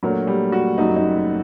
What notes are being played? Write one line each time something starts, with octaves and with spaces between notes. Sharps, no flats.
A#2 F#3 A3 D4 F#4 A#4
G3
F#4
F#1 F#2 F#3 A3 D#4
D#4